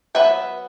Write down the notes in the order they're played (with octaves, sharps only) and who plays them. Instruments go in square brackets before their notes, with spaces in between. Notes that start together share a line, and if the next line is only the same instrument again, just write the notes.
[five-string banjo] F#3 B3 B4 E5